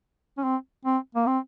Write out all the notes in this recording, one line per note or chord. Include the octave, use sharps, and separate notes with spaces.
C#4
C4
C4
A#3
C4